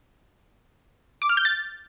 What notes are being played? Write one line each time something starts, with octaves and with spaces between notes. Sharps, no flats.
D6
F6
G6
A6